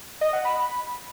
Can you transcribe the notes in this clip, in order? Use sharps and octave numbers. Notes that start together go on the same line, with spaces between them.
D#5
F#5
B5